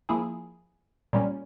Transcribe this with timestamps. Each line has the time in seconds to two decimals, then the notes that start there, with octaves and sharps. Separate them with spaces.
0.09 F3 A#3 E4 G#4
1.13 A#2 G3 C#4